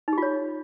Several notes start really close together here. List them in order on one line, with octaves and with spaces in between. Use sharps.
D#4 G4 F4 C#5